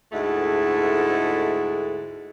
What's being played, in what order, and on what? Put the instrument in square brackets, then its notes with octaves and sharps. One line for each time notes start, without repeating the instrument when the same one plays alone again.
[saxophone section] D2 G#2 G#3 A3 E4 F#5